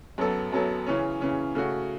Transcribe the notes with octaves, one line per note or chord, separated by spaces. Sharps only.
F#2 F#3 B3 A4
F#2 F#3 B3 A4
C#3 E3 C#4
C#3 E3 C#4
C#3 A3 F#4